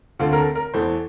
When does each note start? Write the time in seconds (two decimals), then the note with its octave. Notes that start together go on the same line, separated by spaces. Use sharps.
0.19 D2 D3 A3 C4 F4
0.33 A#4
0.38 A4
0.55 A#4
0.74 E2 E3 A3 C5